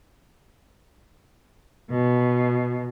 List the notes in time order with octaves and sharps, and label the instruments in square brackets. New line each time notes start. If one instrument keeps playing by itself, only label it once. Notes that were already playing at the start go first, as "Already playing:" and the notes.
[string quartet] B2